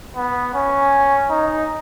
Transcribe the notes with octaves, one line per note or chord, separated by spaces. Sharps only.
B3
C#4
D#4